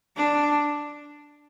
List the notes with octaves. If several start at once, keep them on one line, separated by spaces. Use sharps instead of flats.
D4